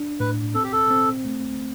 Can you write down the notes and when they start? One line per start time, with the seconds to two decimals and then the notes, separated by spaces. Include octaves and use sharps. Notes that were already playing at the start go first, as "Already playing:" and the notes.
Already playing: D4
0.20 A2 B4
0.55 C4 A4
0.64 G4
0.72 A4
0.90 C4
1.25 A3